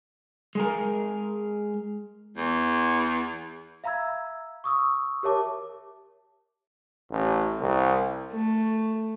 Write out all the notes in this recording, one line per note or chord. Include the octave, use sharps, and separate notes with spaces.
G#3 G#4 A#4
E2
E5 F5 A#5 B5 E6 G#6
C#6 D#6 E6
G4 A#4 C#5 E5 A5 D6
A1
C2
A3